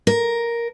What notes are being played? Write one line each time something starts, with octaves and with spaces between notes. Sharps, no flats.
A#4